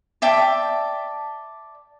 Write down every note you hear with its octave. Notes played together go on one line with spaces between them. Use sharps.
D5 E5 G5 A5